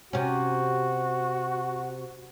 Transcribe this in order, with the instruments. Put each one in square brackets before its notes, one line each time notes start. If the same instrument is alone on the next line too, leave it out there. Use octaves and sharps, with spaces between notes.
[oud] C3 C#4 [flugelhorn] F#4